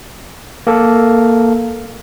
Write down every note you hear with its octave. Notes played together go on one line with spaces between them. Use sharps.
A#3 A4